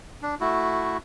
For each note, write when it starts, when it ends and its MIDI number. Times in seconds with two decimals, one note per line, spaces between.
0.22 0.35 62
0.41 0.97 57
0.41 0.97 64
0.41 0.97 66